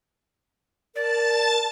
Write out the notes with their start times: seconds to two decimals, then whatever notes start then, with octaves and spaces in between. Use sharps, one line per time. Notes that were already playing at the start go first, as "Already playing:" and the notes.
0.96 A#4 D5 A5 A6